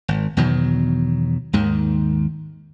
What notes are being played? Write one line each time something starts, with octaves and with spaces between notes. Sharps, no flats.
G#1
E2 B2 D#3 F#3
D#2 G#2 D#3